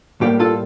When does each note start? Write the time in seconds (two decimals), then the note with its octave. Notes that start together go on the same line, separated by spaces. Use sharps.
0.21 A2 G3 A#3 G4
0.39 F4 A4